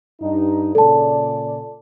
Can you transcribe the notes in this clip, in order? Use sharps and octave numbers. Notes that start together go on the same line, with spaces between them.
G2 D#4
A#2 C#3 A4 D5 A5